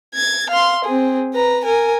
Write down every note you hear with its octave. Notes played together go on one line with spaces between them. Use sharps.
G#6 A6
F5 C6
C4 G#4
B4 A#5
A#4 G#5